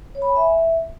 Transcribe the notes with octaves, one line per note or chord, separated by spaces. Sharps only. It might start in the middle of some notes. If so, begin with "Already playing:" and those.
C#5
B5
G#5
E5